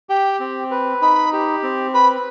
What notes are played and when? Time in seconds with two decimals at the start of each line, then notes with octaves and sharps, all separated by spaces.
0.09 G4 G5
0.40 C4
0.71 B4
1.02 D#4 B5
1.33 G4
1.63 C4
1.94 B4 B5